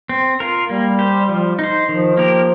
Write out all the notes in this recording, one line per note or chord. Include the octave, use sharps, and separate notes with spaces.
C4
F4 A#4
G3 A#3
G4 C5
F3
D#4 C5
D#3 F3
A#3 G4 A#4